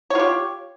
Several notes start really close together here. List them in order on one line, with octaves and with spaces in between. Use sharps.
C#5 F4 G4